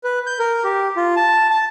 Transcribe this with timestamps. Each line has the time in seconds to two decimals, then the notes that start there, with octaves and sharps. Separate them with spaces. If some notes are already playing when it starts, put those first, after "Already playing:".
0.04 B4
0.26 G6
0.39 A#4
0.64 G4
0.97 F4
1.17 A5
1.50 A5